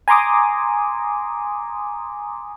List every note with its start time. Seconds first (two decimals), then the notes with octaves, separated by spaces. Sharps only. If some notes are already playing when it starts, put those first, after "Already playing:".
0.08 G#5 A#5 C6 D6 D#6